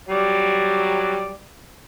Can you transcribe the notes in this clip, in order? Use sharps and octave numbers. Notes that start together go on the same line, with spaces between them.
F#3 G3 D5